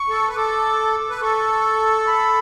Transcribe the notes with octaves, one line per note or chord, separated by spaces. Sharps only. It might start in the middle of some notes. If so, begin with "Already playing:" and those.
Already playing: C#6
A4
B4
A4 D6
B4
A4 C#6
B5